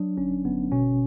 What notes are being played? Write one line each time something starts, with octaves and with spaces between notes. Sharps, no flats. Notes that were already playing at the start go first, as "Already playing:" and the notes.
Already playing: F#3 D4
G1 C#4
G1 B3
B2 C#4